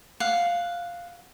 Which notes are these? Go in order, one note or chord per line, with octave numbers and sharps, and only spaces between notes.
F5 F#5